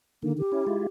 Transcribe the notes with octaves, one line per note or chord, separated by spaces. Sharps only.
D3 D#3 A#3
G4
C#4 E4
G#3 E4 F4